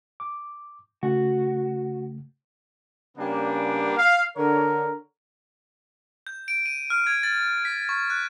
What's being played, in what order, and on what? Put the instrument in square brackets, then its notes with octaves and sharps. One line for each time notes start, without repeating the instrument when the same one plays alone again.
[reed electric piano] D6
[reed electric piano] C#3 A3 [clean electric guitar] F#4
[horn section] C#3 G3 A#3 B3 D4 G4
F5
D3 A#4 C#5
[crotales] G6
D7
D#7
F6
G#6
A6
B6
C#6
F#6